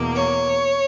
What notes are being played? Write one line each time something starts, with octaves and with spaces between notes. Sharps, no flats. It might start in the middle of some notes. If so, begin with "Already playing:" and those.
Already playing: E2 B2 A#3
C#5